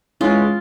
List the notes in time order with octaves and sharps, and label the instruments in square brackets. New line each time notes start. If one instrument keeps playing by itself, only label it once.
[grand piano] E3 G#3 C#4 [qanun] F4